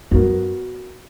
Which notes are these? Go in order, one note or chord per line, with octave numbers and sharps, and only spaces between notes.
F#2 B3 F#4 A#4